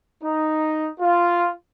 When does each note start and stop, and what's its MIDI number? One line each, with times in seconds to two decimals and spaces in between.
0.23 0.89 63
1.00 1.49 65